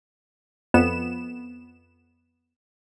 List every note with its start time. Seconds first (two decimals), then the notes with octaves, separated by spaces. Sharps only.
0.74 F2 B3 E7